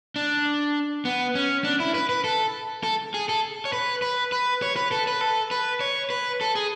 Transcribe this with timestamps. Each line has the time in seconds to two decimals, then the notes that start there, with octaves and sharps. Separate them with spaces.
0.16 D4
1.05 B3
1.35 C#4
1.64 D4
1.80 E4
1.95 B4
2.09 B4
2.24 A4
2.83 A4
3.14 G#4
3.29 A4
3.65 C#5
3.73 B4
4.02 B4
4.32 B4
4.62 C#5
4.76 B4
4.91 A4
5.07 B4
5.21 A4
5.51 B4
5.81 C#5
6.10 B4
6.41 A4
6.55 G#4